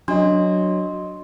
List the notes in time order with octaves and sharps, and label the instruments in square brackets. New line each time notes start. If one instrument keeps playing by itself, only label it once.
[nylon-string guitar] F#3 [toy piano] D4 [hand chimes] D#5 C6